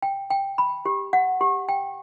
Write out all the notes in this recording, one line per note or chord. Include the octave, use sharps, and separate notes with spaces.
G5
G5
B5
G4
F#5
G4
G5